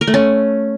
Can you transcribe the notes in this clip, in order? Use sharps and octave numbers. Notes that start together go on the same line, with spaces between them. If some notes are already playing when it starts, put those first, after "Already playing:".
A#4
A3
C#4